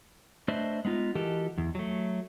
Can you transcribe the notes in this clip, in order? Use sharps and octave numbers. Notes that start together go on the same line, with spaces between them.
A3 D4 B4 C5 D#5 E5
G#3 B3 D#4 F4
E3 F#4 G4 A4 A#4 D#5
E2
F#3 A3